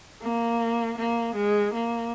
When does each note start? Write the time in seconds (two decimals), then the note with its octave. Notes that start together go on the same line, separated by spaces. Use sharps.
0.22 A#3
0.98 A#3
1.35 G#3
1.74 A#3